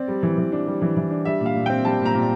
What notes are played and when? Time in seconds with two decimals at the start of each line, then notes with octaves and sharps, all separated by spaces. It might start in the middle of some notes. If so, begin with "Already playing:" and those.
Already playing: C4 D5
0.08 G3
0.23 E3
0.38 E3
0.52 D4
0.67 G3
0.82 E3
0.97 E3
1.11 D4
1.25 G3 E5
1.40 A#2
1.46 F5
1.55 A#2
1.66 C4 G5
1.85 G3 A5
2.00 A#2
2.05 A#5
2.14 A#2